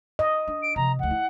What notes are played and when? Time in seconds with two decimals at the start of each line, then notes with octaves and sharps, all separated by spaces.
0.19 D#5
0.48 D4
0.62 D7
0.76 C3 F3 A#5
0.99 D2 F3 F#5
1.11 E4